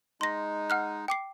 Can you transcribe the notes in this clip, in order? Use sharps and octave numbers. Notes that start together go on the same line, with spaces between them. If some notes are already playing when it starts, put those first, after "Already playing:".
G#3 D#4 C6 A#6
F#5 F6 F#6
G5 D6 C7